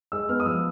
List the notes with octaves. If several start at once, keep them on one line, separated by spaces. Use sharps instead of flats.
G#3 E6
B3 F6
D#6
F3 E6